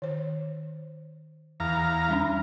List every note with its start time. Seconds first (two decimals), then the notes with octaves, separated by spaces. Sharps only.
0.02 D#3 C5
1.60 E2 F5 A#5
2.08 G3 C#4 D4